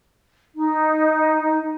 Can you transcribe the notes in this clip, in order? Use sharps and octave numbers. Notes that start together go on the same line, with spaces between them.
D#4